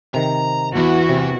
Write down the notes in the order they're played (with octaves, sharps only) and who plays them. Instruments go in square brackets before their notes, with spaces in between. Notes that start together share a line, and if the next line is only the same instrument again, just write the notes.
[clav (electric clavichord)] C3 D#3 [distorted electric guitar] A#5
[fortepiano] E2 [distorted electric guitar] E3 [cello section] B3 E4 F#4
[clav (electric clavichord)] C3